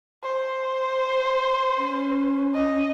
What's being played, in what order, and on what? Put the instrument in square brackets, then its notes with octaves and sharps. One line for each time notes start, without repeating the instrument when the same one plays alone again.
[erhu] C5
[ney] C#4
[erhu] D#5